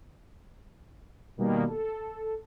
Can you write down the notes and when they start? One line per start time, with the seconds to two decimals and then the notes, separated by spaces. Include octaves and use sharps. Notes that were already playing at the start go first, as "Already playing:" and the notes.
1.38 B2 D#3 G3 A#3
1.67 A4